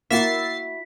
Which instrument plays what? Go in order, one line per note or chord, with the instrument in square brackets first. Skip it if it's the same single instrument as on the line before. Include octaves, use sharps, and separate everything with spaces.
[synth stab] A#3 [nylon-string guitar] E4 F#4 [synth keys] E5 A6 C7 [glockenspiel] B6